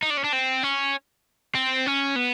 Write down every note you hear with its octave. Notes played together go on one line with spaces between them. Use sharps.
D#4
D4
C#4
D4
C4
C#4
C4
C#4
B3